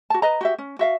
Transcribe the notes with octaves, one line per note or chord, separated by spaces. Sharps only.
F#4 A5
B4 D#5 A#5
F#4 G4 E5
C#4
F#4 E5 F5